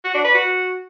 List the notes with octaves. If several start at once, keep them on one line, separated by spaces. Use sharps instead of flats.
F#4
D4
B4
F#4